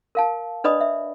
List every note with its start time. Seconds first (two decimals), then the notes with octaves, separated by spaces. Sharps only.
0.15 A#4 F5 A5
0.64 D4 B4 D5 D#5 B5 D#6
0.81 E5